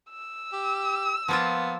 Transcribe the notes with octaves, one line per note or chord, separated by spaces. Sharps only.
E6
G4
F3 A#3 B3 F4